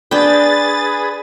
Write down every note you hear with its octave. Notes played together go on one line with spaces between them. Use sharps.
D4 G#4 B4 G5 D#6 A6